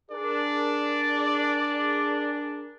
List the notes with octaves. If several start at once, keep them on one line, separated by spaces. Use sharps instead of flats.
D4 G#4 A#4 D5